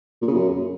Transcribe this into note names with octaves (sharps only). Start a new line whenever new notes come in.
A#2
C#3
F#2